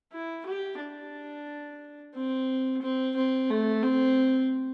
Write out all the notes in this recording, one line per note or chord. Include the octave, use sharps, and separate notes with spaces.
E4
G4
D4
C4
C4
C4
A3
C4